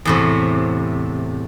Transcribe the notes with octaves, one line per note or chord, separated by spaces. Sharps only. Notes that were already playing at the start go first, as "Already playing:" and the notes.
E2 A2 C3